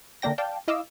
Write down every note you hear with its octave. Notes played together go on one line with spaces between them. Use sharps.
D3 A3 A#3 D4 G5 A#6
D5 F5 G5 A5
E4 D#5 F5 D6 E6